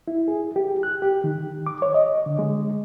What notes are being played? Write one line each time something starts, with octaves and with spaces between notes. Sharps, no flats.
E4
G#4
G4
F#6
G4
D#3
D6
C#5
D#5
D3
G#3